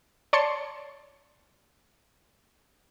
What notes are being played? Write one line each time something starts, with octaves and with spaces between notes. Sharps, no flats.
C#5 D5 A5 C6 C#7